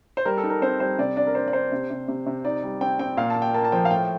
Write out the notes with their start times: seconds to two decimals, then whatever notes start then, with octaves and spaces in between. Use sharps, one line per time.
0.17 C5
0.25 G3 A#4
0.37 A4
0.44 D#4
0.50 A#4
0.62 C4 C5
0.80 G3 C5
0.99 C3 D5
1.17 D4 D5
1.27 A#4
1.35 D4 C5
1.48 D5
1.53 D4 C5
1.72 C3
1.90 C3
2.08 C3
2.26 C3
2.45 D#4 D5
2.63 G3
2.81 C4 G5
2.99 C4 G5
3.17 A#2 F5
3.30 A5
3.36 A#2
3.42 G5
3.54 A#3 A5
3.65 A5
3.72 F3 G5
3.85 F5
3.91 A2 G5